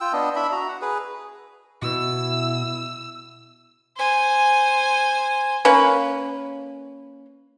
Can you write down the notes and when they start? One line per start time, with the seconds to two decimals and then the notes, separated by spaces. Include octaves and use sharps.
0.01 F4 G5 E6
0.13 B3 D4 D#5
0.36 D4 E4 E5 B5
0.52 F#4 A#5
0.69 F#5
0.82 G#4 B4
1.82 B2 E4 E6
3.97 C5 G#5
5.65 A#3 C#4 B4